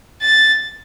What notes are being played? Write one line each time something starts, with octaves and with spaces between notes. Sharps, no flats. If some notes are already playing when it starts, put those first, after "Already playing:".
A6